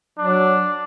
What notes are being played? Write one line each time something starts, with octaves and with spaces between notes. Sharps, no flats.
F#3 D4